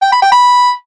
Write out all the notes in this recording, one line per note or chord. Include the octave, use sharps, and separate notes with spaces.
G5
B5
G5
B5